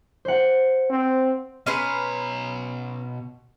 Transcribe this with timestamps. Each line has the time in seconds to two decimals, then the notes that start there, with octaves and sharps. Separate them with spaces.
0.25 C5 F#5
0.90 C4
1.66 B2 C#4 B4 A#5 C6